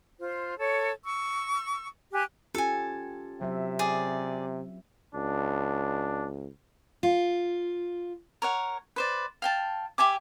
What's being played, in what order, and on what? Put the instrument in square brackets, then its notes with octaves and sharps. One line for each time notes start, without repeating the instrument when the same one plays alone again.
[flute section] F4 C5
A4 C#5
C#6 E6
G4 G#5 F#6
[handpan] C#4 F4 G4 [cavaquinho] A4 G#5
[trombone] C3 [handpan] F#3 C4 E5
[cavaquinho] G#4 D5
[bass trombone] C#2 [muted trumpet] D4
[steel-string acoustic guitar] F4
[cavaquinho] A#4 C#5 F#5
B4 C5 D5
F5 G5 A5
G4 E5 G#5 D6